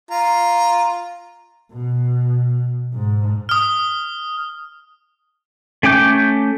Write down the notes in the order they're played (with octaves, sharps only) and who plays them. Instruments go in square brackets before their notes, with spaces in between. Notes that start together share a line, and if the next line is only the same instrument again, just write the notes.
[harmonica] F4 A#5
[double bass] B2
G#2
[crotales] D#6 F6
[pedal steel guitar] A3 C#4 G5 D6 G6